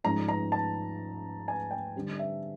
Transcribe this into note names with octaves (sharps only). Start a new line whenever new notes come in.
G#2 F3 G#3 C#4 A#5
A#5
A5
G#5
G5
D3 G3 C4
E5